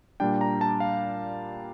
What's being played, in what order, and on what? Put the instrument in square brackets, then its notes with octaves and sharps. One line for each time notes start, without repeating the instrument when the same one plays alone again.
[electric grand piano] A#2 G3 D4 G5
A#5
A5
F5